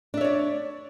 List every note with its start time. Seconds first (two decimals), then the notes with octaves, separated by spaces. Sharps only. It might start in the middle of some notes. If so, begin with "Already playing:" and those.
0.14 D4
0.17 E5
0.21 C#5
0.24 D5